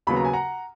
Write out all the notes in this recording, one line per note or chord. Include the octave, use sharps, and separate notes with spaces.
D#2 C#3 F#3 B3 B5
A#5
G#5
F#5 A#5